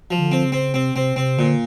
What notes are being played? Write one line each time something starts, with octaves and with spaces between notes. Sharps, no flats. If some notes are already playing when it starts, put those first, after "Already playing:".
F3
D3
C4
C#3
C4
C3 C4
C3 C4
C3 C4
A#2 D3